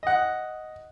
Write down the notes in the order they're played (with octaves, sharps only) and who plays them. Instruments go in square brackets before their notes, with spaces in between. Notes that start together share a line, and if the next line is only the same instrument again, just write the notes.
[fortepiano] D#5 F#5